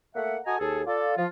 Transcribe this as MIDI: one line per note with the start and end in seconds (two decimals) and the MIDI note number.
0.16 0.37 57
0.16 0.37 58
0.16 0.37 76
0.16 0.37 78
0.46 0.57 66
0.46 0.57 69
0.46 0.57 75
0.46 0.57 80
0.46 0.57 82
0.46 0.57 87
0.59 0.81 39
0.59 0.81 68
0.59 0.81 69
0.86 1.14 65
0.86 1.14 69
0.86 1.14 74
1.17 1.26 53
1.17 1.26 65